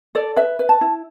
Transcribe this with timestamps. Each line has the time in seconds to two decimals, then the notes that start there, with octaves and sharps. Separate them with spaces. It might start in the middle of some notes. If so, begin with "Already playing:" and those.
0.15 A4 D5
0.36 B4 E5
0.59 B4
0.69 A5
0.81 E4